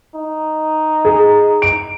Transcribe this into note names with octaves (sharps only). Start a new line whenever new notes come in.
D#4
G#4
D7